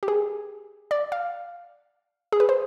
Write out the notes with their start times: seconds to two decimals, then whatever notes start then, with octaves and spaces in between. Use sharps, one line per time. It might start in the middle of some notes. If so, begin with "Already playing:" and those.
0.03 G4
0.08 G#4
0.91 D5
1.12 F5
2.32 G#4
2.40 B4
2.49 C5